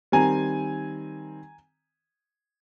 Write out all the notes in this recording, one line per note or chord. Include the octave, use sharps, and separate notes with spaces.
D#3 G3 C4 G#5 A#5